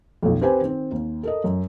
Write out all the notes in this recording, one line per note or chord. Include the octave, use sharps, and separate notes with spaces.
B1 F2
C4 G4 B4 C5 G#5
D#3 C4
D#2
A4 A#4 D#5
F#2